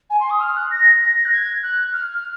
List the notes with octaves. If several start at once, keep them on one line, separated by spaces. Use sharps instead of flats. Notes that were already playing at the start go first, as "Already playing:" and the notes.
G#5
C6
D#6
F6
F#6
A#6
A#6
F#6
G#6
F#6
F6